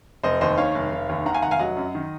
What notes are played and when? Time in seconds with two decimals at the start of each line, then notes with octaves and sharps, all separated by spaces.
0.24 F1 C5 D#5
0.41 D#2 C5 D#5
0.58 D#3 C#5 F5
0.75 F1
0.91 F1
1.09 D#2
1.25 D#3 F#5 A#5
1.35 F5 G#5
1.42 F1 F#5 A#5
1.51 F5 G#5
1.59 F#3 D#5 F#5
1.77 F#2
1.95 D#3